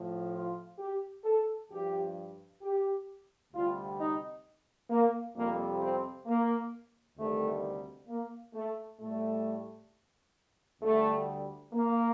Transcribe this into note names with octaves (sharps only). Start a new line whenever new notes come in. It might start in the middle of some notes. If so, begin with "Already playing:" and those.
Already playing: A2 F3
F4
G4
A4
G2 F3 G4
G4
D2 C3 G3 F4
D#4
A#3
F2 C3 G3 A#3
C4
A#3
D2 C3 D#3 G3 A3
A#3
A3
A2 G3 A3
D2 D3 G3 A3
A#3